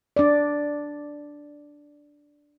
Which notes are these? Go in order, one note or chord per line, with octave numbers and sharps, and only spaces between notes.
D4 D5